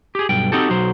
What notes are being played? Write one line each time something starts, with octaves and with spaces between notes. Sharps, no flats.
G4 G#4
B1 G2 G5
C4 D#4 F#4 G4 A4
B1 F#3 C5